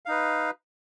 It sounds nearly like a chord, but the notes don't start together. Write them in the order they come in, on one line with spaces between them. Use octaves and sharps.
F5 D#4 B4